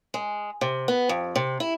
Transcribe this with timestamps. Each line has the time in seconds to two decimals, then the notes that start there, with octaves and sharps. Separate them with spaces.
0.14 G#3
0.61 C3
0.88 B3
1.09 F2
1.36 C3
1.60 E4